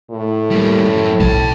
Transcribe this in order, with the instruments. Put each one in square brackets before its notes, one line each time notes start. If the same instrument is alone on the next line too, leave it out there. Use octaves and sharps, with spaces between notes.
[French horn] A2
[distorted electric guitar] G3 A#3
F#2
[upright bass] B1 [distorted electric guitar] G5 A5